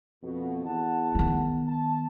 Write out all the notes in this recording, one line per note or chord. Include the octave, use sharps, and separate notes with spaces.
F2 B2
E2 F#5 A5
D#3 B3
A5